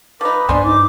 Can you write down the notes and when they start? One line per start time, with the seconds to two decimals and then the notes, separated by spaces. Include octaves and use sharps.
0.21 F3 D#4 B4 D6
0.49 G2 D4 C5 D5 G#5 C6
0.64 D#4 D6